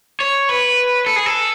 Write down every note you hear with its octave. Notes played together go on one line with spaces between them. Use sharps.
C#5
B4
A4
G#4
A4